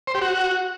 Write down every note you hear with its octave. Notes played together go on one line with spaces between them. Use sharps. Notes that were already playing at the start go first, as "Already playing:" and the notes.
C5
G4
F#4